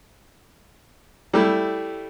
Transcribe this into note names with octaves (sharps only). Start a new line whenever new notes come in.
G3 A3 E4